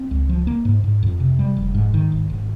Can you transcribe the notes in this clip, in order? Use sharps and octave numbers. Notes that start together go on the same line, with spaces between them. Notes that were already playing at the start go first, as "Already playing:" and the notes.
Already playing: C4
C#2
F3
A#3
G#2
G#2
F2
C3
G3
F1
G#2
D#3
G#1
G#1